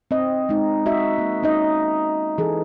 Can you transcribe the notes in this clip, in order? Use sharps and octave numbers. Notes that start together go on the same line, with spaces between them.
C4 D#5
G#3 D#4
F#4 D#5 E5
A#3
C#4 D#4 D#5
E3 G#4 A4